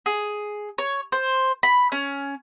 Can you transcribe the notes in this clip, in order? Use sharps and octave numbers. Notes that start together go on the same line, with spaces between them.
G#4
C#5
C5
B5
C#4